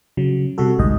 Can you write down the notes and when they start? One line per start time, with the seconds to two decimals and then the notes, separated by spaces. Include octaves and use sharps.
0.17 C#3 F#3
0.58 C3 G3 F#4 A4
0.78 A1 D2 G#2 D#5